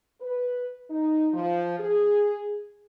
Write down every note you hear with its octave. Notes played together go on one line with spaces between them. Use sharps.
B4
D#4
F3
G#4